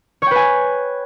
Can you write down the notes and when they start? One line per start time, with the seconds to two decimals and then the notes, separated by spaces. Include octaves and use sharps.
0.22 C#5
0.26 G5
0.31 B4
0.36 G#5